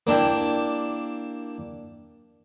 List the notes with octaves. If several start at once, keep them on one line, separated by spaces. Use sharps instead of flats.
A#3 D4 E4 G4